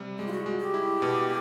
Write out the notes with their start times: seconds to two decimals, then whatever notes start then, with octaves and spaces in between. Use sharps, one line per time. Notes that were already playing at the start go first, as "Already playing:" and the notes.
Already playing: C3 G3
0.19 G#3 G4
0.27 F4
0.32 F#4
0.46 G#3
0.60 G4
0.74 E4
1.02 B2